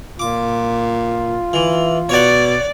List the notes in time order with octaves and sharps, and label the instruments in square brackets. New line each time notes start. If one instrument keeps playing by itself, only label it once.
[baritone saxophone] A#2 [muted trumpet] F4 [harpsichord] D6
[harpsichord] E3
[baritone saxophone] B2 [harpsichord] C#5 F#5 [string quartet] D5